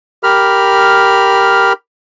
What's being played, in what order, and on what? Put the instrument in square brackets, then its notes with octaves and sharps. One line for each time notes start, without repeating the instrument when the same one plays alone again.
[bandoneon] G4 A#4 B5 F6